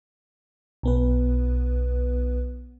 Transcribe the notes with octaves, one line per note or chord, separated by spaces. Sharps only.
B1 B3 B4